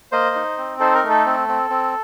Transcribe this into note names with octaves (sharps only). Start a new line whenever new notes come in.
A#3 C5 D#5
D#4
C4
D#4 A4 C5
A#4
A3
A4
C4
C4
C4